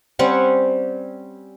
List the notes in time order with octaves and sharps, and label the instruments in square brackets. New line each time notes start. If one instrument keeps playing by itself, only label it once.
[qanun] G3 C4 C#4 F#5